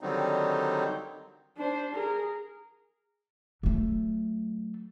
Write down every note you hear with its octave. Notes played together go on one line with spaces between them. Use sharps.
D3 D#3 F#3 G3 C4 D#4
D4 C5
G#4 A#4
F#3 A3